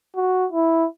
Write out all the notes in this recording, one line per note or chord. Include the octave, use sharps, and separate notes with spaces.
F#4
E4